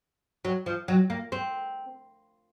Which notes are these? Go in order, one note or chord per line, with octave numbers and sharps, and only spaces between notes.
F#3
F3
F#3
A#3
C4